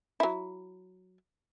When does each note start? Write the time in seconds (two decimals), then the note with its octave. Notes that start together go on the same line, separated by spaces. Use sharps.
0.20 F#3 E4